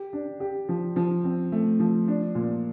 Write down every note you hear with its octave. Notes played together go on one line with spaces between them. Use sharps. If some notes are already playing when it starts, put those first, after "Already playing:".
Already playing: G4
D4
G4
F3
F3
C4
A3
F3
D4
A#2